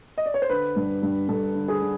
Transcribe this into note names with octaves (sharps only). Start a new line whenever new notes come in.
D#5
D5
C#5
C5
D3 B4
G2
G2
G2 A4
D3
G#4
D3